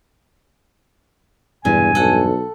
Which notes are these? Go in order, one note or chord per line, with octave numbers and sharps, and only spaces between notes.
E1 E2 G2 A#2 D4 G#5
B1 A4 F#5